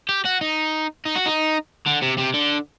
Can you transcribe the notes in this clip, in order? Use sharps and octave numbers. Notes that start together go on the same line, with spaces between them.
G4
F#4
D#4
D#4
F#4
D#4
D3
C3
C3
D3